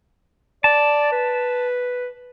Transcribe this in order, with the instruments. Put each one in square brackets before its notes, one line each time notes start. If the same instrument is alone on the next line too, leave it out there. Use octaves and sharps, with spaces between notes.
[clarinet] D5 [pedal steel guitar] A5
[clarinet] B4